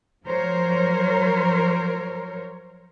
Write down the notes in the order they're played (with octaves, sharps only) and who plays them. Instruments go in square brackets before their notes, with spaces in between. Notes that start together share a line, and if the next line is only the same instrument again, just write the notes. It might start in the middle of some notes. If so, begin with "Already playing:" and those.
[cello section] F3 F#3 A#4 C5 C#5